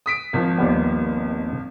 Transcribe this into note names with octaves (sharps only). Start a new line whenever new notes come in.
D#6 B6 D7
G#1 F3
D#2 G3 B3